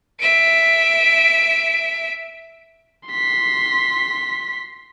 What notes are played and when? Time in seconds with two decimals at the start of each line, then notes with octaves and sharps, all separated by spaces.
0.20 E5 D7
3.08 C6 B6